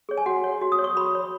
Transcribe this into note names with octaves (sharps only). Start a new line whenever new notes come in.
G#4 C#5
G#5
F#4 F#5
C#5
F#4
D#6
C#5
C#6
F#4 B5
C#5